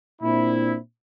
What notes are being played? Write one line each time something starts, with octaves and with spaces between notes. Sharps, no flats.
A#2 C4 D4 E4